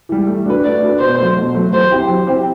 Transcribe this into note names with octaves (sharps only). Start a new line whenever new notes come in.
E3 G3
A3
D4 F#4 B4
A3 D5
D4 F#4 B4
B2 C5
F#3 A3
B2
F#3 A3
F#3 C5
C4 E4 G4 C5
F#3
C4 E4 G4 C5